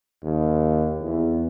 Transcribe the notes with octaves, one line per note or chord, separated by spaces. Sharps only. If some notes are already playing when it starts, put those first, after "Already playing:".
D#2
E2